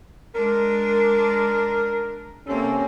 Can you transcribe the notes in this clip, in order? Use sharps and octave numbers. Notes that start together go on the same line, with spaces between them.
G#3 D4 A#4
C3 A#3 C4 C#4 A4